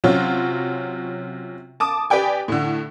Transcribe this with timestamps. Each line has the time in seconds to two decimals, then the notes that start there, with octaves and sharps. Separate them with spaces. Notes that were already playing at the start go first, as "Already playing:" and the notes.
0.04 C3 F#3 C#4 F4 F#4
1.80 A5 D6 D#6
2.10 G4 B4 D5 G5 G#5
2.48 A2 D3